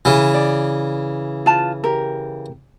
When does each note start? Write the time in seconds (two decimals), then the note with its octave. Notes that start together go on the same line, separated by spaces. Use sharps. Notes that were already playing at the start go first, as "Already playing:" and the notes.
0.05 C#3 E3
0.34 D5
1.46 F4 B4 A5
1.84 G4 A#4